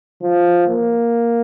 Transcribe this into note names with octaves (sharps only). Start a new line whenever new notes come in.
F3
A#3